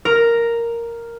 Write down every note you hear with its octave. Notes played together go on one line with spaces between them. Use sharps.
A#4